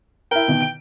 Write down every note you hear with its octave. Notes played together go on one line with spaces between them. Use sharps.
E4 A#4 G5
B2 D#3
D7